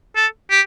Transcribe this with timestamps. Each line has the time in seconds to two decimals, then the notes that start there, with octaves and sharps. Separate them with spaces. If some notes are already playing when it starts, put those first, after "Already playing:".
0.16 A4
0.51 G4